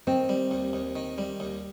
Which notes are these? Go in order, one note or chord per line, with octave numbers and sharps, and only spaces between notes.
D#3 C4
G3
D#2
D#2
D#3
G3
D#2